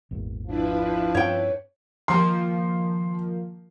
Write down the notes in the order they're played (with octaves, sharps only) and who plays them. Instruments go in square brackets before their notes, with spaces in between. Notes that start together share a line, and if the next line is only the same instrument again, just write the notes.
[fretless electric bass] G#1 E2 A#2
[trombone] F3 [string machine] D4 E4 B4
[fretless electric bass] G2 C4 C#4 [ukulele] C#5 G5
[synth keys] D#3 F3 A#3 [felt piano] C6